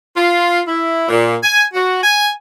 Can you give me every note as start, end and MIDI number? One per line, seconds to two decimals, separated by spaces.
0.17 0.60 65
0.68 1.05 64
1.09 1.36 46
1.43 1.64 80
1.74 2.00 66
2.03 2.31 80